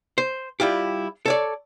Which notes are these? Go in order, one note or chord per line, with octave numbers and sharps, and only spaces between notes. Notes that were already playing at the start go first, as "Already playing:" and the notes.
C5
G3 E4 F4 G4
A4 C#5 D5